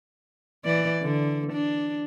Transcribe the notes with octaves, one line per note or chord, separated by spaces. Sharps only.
E3 D5
D3
D4